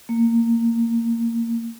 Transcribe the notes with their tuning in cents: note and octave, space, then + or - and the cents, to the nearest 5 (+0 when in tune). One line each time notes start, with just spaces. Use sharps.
A#3 -15